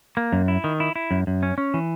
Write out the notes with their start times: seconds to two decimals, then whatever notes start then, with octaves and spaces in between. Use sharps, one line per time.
0.17 A#3
0.33 F#2
0.48 E4
0.64 D#3
0.80 E4
0.96 E4
1.11 F#2
1.27 F#2
1.43 C#4
1.58 C#4
1.74 E3